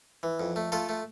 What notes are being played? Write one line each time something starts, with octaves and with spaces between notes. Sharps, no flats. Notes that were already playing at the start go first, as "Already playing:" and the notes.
E3
F2
A3
A3 F4 A4
A3